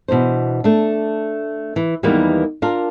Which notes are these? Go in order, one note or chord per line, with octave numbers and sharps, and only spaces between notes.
B2 E3 D4 C5
A3 D4
E3
D#2 E3 G3 G#3 A#3 B3
D4 F4 A#4